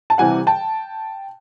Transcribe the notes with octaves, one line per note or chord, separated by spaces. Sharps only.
A5
C3 E3 G3 F#5 G#5
G5 A5